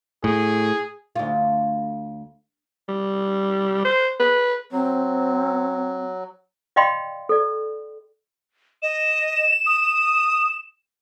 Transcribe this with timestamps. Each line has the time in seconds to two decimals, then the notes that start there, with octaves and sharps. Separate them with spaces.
0.24 A2 G#4
1.16 D2 F4
2.88 G3
3.85 C5
4.20 B4
4.72 F#3 C4
6.76 D5 D#5 F5 G5 B5 C6
7.29 A4 D5
8.82 D#5 E7
9.66 D#6